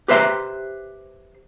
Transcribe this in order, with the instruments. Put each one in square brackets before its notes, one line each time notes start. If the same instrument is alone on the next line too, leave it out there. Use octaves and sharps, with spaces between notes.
[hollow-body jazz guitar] G4 B4 C5 E5 A#5 C6